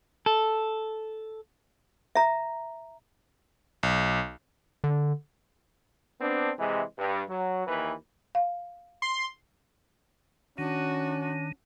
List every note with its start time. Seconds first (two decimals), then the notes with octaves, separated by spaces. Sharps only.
0.26 A4
2.15 E5 A#5
3.83 B1
4.84 D3
6.21 B3 C4 D4
6.58 C3 E3 G#3
6.98 G2
7.28 F#3
7.67 D#2 E3 B4
8.35 F5
9.02 C6
10.58 D#3 C#4 D4 F#4